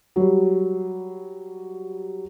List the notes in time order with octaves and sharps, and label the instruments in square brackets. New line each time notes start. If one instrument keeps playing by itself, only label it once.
[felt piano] F#3 G3